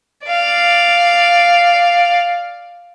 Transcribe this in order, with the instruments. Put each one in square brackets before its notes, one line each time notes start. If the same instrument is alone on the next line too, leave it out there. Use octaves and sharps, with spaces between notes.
[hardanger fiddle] D5 F5